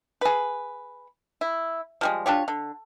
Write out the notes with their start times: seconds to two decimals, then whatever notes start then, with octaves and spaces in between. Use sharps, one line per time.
0.21 G#4 B4
1.41 E4
2.01 F3 G3 G#3
2.26 D4 F4 G4 C#5
2.48 D3